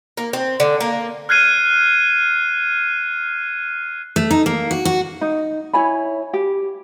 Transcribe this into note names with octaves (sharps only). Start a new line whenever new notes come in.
A#3
C4
D3
A#3
F6 F#6 G#6 C7 D#7
A3
D#4
A#3
F#4
F#4
D#4
E4 C#5 G#5 B5
G4